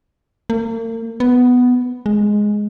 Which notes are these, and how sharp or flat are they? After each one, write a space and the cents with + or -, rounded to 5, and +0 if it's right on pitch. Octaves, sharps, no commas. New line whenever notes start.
A#3 -40
B3 +5
G#3 +0